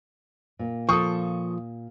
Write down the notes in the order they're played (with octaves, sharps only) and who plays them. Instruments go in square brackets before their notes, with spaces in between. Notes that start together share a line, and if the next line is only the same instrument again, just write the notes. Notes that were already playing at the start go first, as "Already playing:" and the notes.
[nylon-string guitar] A#2
[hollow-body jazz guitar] F3 A4 [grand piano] C#6 D#6